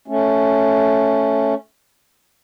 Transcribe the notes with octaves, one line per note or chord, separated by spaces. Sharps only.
A3 C#4